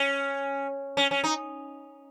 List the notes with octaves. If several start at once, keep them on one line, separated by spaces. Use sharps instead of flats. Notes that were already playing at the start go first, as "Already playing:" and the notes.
Already playing: C#4
C#4
C#4
D#4